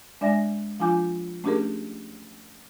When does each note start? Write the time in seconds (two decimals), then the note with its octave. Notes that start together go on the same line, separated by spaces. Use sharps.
0.21 G#3 D4 D5 E5 G#5 A#6
0.80 F3 D4 F4 G#5 D6 G6
1.44 A3 C#4 D4 G4 G#4 A#4